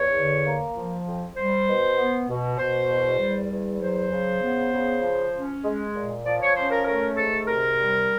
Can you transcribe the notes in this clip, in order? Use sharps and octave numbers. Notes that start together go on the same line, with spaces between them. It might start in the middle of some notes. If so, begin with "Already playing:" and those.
Already playing: E2 C#5
D3
A#3
F3
F2
G3 C5
B2
B3
B2
B2 C5
E2
G3
E2
F#3 C5
C#3
B3
C#3
F3
C#4
G#3
A#2
F3 D5
C#5
C#4 C5
A#4
A3 A#4
G#2 A4
C3 A#4
G3